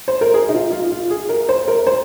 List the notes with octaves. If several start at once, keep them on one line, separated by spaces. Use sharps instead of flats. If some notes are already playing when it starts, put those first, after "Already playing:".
C5
A#4
G#4
D#4
F4
F4
F4
G#4
A#4
C5
A#4
C5